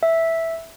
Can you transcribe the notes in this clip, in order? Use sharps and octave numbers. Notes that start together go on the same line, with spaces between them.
E5